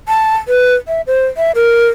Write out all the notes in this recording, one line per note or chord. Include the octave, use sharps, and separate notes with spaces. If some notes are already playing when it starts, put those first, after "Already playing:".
A5
B4
E5
C5
E5
A#4